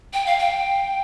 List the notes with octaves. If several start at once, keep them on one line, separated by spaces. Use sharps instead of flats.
G5
F5
G5